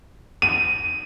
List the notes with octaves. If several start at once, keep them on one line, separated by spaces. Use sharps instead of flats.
D#7